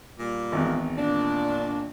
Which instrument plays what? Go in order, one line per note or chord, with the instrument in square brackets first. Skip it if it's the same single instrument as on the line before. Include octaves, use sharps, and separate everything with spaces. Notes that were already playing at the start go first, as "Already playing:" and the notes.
[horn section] A#2 G3 A#3
[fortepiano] G#1 E2
[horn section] A#2 D4